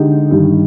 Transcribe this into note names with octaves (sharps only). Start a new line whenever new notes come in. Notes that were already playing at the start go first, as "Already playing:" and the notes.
Already playing: D3 G#3 D#4 G4
G2 D#3 G3